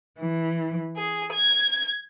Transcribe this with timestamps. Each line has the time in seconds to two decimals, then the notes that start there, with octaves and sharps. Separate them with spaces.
0.21 E3
0.96 G#4
1.33 G#6